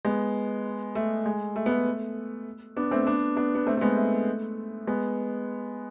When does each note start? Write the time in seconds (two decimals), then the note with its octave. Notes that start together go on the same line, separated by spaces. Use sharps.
0.05 G#3 B3
0.95 A3
1.26 G#3
1.56 A3
1.66 B3
1.71 A3
2.77 B3 D4
2.91 A3 C4
3.06 B3 D4
3.36 B3 D4
3.55 B3
3.67 A3 C4
3.77 A3
3.81 G#3 B3
3.97 A3
4.87 G#3 B3